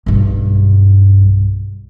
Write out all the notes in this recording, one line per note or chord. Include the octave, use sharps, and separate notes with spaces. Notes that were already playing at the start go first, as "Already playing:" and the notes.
B1 G2